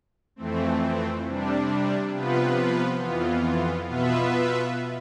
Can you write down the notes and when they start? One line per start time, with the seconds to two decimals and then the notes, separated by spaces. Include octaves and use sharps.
0.36 F2 E3 A3 C4
1.24 C3 G3 D4
2.12 C3 F3 B3 F4 B4
3.00 F2 E3 B3 F4
3.87 B2 B3 F4 B4 E5